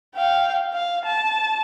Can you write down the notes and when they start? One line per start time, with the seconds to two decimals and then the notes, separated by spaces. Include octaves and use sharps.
0.15 F5 G5
0.73 F5
1.05 A5